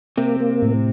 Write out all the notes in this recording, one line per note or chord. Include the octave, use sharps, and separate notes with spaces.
C3 A#3 C4
A#3
A2